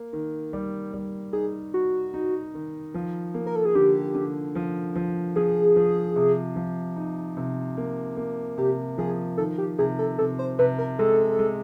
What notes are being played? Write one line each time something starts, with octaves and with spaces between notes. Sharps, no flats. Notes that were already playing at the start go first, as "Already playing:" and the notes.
Already playing: A#3
D#3
G3
G3
D#4 G#4
D#4 F#4
D#4
D#3
F3
A#3
A#4
A4
G#4
D3 G4
D3
F3
F3
F3 G#4
F3
C3
F3
D#4
C3
A#3
A#3
C3 G4
F3 G#4
D#3 A4
G4
C3 G#4
A4
C3 A4
C5
C3 B4
A#4
G#3 A4
G#3